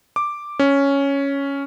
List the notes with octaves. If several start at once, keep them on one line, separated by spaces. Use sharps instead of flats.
D6
C#4